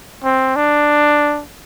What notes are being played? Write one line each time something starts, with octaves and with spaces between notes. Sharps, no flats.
C4
D4